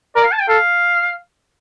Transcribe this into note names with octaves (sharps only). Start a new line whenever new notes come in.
A#4 D5
F5
A5
G5
A4 F5